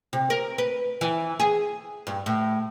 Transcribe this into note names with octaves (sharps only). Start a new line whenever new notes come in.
C3
A#4
B4
E3
G#4
G2
A2